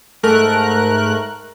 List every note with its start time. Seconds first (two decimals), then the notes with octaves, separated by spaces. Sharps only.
0.23 G#2 A3 A#4 F#6